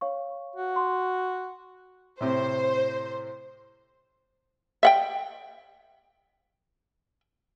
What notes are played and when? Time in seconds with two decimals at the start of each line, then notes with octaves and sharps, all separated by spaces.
0.01 C#5 F5 C#6
0.56 F#4
0.76 C6
2.21 A2 C3 C5
4.83 E5 F#5 G5